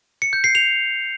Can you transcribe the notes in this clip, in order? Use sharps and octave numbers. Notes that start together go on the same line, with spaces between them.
C#7
G6
C7
F7